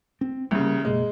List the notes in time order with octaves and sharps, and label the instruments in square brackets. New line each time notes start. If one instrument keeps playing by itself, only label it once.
[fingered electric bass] C4
[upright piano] C2 C#3 [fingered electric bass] E3 G3 A#3
[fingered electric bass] F#1 B2 A#3 [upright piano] G#3